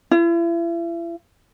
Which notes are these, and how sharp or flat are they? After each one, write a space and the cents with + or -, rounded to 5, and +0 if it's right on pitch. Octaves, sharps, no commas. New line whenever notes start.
E4 +40